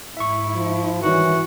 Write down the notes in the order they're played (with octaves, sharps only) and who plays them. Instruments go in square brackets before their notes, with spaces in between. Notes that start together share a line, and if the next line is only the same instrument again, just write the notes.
[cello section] G#2 E4 [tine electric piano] E5 C#6
[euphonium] F3
[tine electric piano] D#3 G3 C#4 [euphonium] E3 [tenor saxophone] F#4